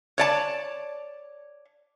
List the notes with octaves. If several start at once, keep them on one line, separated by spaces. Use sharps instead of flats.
C#5 D5 A5